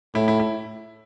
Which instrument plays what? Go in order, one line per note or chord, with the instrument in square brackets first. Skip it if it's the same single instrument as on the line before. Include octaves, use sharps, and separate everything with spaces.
[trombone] A2 [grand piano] E4
[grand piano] E4
E4